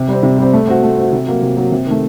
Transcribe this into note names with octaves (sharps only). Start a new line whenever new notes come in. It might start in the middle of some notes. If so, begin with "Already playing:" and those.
Already playing: C3
G3 C4
C3
G3 C4
A3
C4 F#4
A3
C4 F#4
C3
F#3 A#3 F#4
C3
F#3 A#3 F#4
C3
D#3 A3